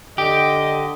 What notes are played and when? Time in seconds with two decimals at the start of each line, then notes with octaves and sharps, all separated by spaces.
0.18 D3 G4 D#5